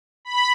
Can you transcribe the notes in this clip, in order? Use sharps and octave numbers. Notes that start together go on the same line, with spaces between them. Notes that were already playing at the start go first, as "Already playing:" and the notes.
B5